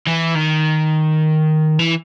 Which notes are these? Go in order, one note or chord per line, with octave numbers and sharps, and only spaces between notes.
E3
D#3
E3